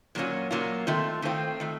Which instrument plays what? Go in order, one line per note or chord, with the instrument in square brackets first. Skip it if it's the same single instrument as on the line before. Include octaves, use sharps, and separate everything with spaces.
[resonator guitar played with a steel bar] A#2 F#3 A#3 C#4 F4
A#2 F#3 A#3 C#4 F4
D#3 A3 C4 F4
D#3 A3 C4 F4
D#3 A3